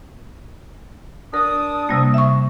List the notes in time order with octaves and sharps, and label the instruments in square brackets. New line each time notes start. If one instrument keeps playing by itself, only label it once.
[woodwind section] D4 D#6 [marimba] A#4
[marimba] C3 G3 A#3
E5 C#6